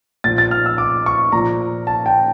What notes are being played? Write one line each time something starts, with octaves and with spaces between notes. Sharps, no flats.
A#2 F3 A6
A6
F6
E6
D6
C#6
A#2 F3 A#5
A5
G5